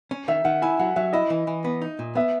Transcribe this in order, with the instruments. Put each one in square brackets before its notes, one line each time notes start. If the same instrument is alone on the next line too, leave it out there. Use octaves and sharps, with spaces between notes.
[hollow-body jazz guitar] C#4
[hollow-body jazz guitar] D#3 [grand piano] E5
[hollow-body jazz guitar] D#3 [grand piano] F#5
[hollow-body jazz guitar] E4 [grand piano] G#5
[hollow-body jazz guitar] F#3 [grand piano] F#5
[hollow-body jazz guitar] F#3 [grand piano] E5
[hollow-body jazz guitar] E4 [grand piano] D#5
[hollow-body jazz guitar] E3
E3
B3
D#4
A#2
[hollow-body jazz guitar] B3 [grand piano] E5